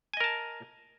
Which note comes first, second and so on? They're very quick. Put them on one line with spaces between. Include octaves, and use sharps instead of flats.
G#5 D#5 A#4 A5